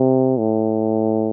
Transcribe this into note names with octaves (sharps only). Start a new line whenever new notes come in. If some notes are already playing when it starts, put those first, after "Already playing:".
Already playing: C3
A2